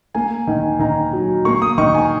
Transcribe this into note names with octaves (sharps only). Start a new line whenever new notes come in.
A#3 G#5
D#3
D#3 A#5
F#3
A#3 C#6
D#6
D#3 C#6
G#5